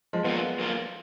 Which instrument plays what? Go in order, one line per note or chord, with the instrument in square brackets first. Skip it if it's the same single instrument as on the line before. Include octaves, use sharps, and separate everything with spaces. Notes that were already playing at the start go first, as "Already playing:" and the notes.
[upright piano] F3 G#3
[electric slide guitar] F#2 F3 A#3 F4 [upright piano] G#3 B3
[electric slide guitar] F#2 F3 A#3 F4